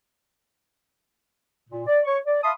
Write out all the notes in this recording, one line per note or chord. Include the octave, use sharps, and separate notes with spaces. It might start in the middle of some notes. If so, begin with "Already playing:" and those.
A#2
D5
C#5 C#6
D5
E5 F5 A5 B5 C6 D#6